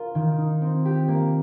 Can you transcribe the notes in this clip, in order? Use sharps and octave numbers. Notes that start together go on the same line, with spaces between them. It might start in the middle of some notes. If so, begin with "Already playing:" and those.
Already playing: F4 A#4
D#3
D#4
C4
G4
A#3